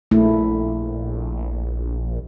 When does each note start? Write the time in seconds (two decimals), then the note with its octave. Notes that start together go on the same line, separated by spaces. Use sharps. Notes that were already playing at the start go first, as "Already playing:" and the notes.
0.11 A#1 A3 E4